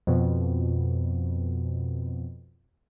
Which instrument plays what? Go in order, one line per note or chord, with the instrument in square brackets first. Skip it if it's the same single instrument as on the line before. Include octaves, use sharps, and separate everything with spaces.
[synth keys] F2 B2